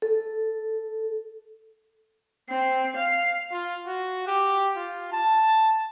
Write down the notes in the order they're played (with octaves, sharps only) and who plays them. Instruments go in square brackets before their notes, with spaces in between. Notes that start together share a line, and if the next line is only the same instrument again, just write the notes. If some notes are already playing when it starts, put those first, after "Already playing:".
[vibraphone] A4
[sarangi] C4
F5
[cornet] F4
F#4
G4
F4
A5